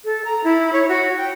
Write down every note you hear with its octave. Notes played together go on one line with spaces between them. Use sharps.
A4
A#5
E4
C#5
F#4
G5